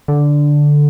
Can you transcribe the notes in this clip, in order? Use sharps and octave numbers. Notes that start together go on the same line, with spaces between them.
D3